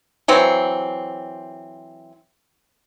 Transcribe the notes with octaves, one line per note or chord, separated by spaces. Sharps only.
E3 F#3 C4